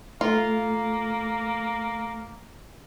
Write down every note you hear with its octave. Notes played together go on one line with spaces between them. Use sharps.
A3 A#3 F4